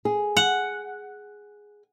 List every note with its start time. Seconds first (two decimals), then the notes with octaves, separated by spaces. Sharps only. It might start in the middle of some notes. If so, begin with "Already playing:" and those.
0.05 G#4
0.37 F#5